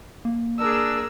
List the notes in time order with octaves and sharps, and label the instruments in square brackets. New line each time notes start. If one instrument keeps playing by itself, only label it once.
[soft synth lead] A#3
[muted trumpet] D4 [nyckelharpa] G#4 A#4 [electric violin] E6